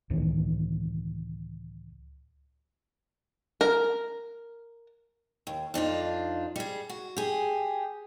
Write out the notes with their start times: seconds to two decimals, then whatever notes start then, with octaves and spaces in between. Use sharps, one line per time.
0.10 C#2 A2 D#3 E3
3.61 A#4
5.47 D#2
5.74 F2 D4 D#4 F4
6.56 G3 G#4
6.89 F#4
7.17 G4 G#4